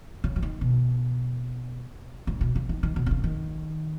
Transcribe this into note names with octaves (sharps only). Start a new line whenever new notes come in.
C#3
F#3
D#3
B2
G#2
B2
C#3
D#3
D#3
B2
B2
C#3
D#3